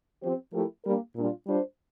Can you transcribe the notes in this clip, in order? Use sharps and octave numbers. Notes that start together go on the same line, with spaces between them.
F3 C4 G4 C5
F3 A3 E4 G4 A#4
G3 A#3 D4 G4 A#4
A#2 G3 D4 F4
G3 D4 F4 C5